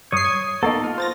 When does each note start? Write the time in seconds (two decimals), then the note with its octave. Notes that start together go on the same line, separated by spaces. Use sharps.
0.12 G2 C#5 D#6 C7
0.25 G#6
0.63 A#3 B3 D#4 A4
0.84 F4
0.98 C5 A6 A#6